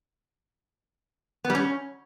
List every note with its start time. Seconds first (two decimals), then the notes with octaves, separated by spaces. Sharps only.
1.45 B3
1.50 G3
1.55 C#4